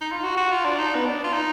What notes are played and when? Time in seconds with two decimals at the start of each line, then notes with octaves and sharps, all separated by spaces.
0.01 D#4
0.12 F4
0.23 F#4
0.37 F#4
0.51 F4
0.65 D4
0.79 D#4
0.95 B3
1.05 D4
1.24 F4
1.33 D#4